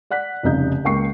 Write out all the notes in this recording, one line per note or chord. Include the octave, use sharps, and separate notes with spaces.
D5 F#5 F#6 B6
F1 C2 C#3 D#4 D#5 G6
C#2 A#3 G5 C#6 C7